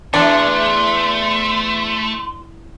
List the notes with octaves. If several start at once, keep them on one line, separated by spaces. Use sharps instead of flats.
E2 A3 D4 C6